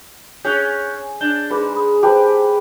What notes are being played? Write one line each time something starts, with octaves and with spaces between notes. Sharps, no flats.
C#4 G#4 F#6 G6
D4 D5 G6 G7
G#2 G#4 B4 D6
B5 D#6
G4 B4 C5 G#5 A5